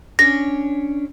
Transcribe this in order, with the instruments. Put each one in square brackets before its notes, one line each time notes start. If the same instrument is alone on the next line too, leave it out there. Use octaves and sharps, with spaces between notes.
[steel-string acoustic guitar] C#4 D4 C#5 [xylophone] A#6